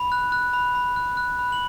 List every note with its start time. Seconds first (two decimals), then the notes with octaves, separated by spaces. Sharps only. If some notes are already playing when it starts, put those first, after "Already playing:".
Already playing: B5
0.12 F#6
0.32 F#6
0.53 B5
0.75 B5
0.96 F#6
1.17 F#6
1.39 B5
1.52 F#7